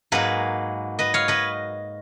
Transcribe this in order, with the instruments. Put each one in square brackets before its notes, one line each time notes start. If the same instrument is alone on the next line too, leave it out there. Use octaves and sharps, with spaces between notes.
[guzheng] G#2 F#3 A#3 G#4 B4
B4 D#5
C#5 F5
B4 D#5